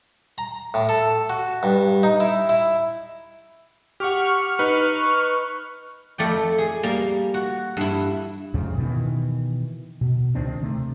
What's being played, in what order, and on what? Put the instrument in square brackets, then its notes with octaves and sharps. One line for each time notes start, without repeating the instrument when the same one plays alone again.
[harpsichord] A#5
A2
A4
F#4
G2
D#4
E4
E4
[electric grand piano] G4 F#5 [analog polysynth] C#6 F6
[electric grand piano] D#4 B4
[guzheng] F2 A3 D5 G5
G#4
G3 A#3
F#4
G2 E4
[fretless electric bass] F2 G#2 C#3
B2 D#3 E3
B2
C#2 D#3 C4 D4
C3 A3